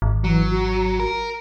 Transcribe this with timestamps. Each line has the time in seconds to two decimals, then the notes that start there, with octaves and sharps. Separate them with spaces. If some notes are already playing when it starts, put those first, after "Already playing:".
0.02 G#1
0.24 E3 F#3
0.50 F#4
0.99 A#4